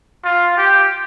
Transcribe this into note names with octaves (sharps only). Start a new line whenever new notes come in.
F4
G4